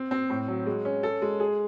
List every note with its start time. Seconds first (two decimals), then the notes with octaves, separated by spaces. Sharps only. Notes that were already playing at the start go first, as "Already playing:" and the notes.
Already playing: C4
0.11 C4
0.30 A2
0.48 F#3
0.67 G#3
0.85 C#4
1.03 A4
1.22 G#3
1.40 G#4